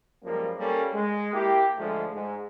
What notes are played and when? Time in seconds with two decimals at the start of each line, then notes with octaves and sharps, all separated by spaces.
0.23 F#2 F3 G3 G#3 A#3
0.58 G3 A#3 C#4 G4 A4
0.93 G#3
1.32 A#3 E4 G4
1.77 G#2 D3 F3 G#3 A3
2.12 G#2